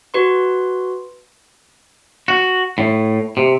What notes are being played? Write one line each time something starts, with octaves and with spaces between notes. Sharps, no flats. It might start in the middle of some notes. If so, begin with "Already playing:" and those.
F#4 B4 C6
F#4
A2
C3